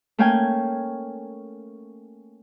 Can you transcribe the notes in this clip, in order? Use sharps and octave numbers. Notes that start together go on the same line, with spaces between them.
A3 A#3 C#4 G5 G#5